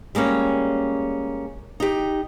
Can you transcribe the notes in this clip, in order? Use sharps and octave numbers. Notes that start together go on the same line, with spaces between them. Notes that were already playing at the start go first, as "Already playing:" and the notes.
G3 G#3 A#3 C#4
D#4 G4